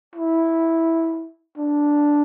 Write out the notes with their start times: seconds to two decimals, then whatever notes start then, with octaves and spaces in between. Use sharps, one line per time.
0.16 E4
1.57 D4